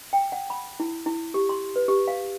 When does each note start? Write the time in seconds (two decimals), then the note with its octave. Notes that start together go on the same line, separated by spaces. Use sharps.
0.13 G5
0.32 F#5
0.50 B5
0.80 E4
1.06 E4
1.34 G4
1.49 C6
1.76 B4
1.88 G4
2.08 F5